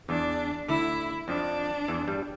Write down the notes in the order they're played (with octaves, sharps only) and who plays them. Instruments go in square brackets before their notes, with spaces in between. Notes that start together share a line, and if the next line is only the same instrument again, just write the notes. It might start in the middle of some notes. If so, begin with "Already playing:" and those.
[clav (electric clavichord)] E2 E3 [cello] D4
[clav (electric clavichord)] D2 D3 [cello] E4
[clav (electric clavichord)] F2 F3 [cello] D4
[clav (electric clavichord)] E2 E3
G2 G3